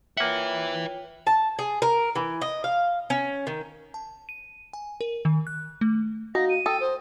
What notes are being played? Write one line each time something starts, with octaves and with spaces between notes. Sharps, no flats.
A#3 F4 B4 C#5 E5 F#5 G5
A5
G#4
A#4
E3
D#5
F5
C#4
D#3
A5
D#7
G#5
A#4
D#3
F#6
A3
D#4 F#4 F5 A#6
D#7
A4 G5 D#6
C5